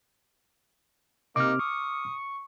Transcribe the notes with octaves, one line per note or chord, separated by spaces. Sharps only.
C3 A#3 D#4 D6 F6
C#6 D#6